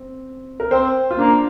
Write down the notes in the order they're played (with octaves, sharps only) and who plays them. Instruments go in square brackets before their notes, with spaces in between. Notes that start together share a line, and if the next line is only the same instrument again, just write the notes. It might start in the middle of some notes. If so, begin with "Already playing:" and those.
Already playing: [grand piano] C4
A#4
[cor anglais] C4 [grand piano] C5
[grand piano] F4
[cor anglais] A#3 [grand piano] D4